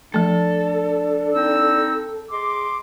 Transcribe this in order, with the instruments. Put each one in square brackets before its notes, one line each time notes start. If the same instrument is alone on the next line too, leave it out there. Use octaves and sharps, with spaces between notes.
[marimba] F3 A3 [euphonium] D4 [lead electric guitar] A4
[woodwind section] C4 D#4 E6
[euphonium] G#4 [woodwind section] D#5 C6 D6